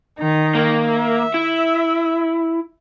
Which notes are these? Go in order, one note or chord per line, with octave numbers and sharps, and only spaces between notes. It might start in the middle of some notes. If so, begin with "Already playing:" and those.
D#3 D#4
A#3
E5
E4